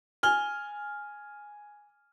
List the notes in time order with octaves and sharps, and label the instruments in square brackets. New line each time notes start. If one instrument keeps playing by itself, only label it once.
[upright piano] G#5 F6 G7